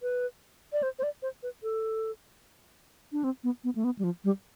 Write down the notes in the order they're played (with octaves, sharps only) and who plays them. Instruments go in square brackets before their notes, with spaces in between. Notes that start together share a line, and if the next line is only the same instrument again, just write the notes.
[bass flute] B4
D5
C5
C5
D5
C5
B4
A4
D4
C4
B3
B3
A3
B3
G3
F3
G3